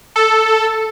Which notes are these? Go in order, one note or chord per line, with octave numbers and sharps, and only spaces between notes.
A4